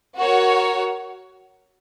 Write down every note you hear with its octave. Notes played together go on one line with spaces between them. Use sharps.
F#4 A#4 C#5